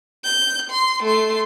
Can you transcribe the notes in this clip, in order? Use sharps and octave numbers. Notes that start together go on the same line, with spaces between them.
G6
C6
A3 C6